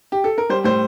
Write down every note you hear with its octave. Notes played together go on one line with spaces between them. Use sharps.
G4
A4
A#4
G3 C5
A2 C5